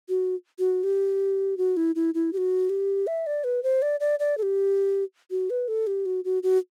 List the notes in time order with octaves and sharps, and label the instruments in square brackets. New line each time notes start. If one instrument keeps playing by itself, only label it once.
[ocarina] F#4
F#4
G4
F#4
E4
E4
E4
G4
F#4
G4
E5
D5
B4
C5
D5
D5
D5
A4
G4
F#4
B4
A4
G4
F#4
F#4
F#4